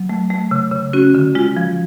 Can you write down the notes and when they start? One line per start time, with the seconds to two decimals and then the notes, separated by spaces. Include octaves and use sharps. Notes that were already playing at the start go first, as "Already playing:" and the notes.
Already playing: F#3
0.09 A3
0.30 A3
0.51 C#3
0.72 C#3
0.93 C#4 F#4
1.15 D3
1.35 G#3 F4
1.56 F3